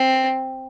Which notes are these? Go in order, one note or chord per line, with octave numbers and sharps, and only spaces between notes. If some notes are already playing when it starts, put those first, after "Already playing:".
Already playing: C4